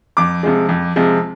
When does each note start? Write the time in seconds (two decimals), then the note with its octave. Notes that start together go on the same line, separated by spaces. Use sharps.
0.17 F2 D6
0.43 C3 F3 G#3
0.69 F2
0.96 C3 F3 G#3